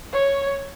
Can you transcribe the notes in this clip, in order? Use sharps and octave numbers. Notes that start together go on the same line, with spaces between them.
C#5